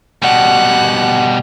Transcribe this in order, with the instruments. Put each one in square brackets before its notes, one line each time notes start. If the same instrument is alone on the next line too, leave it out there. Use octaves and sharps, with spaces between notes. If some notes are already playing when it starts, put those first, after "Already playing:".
[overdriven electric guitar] B2 G3 [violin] F#5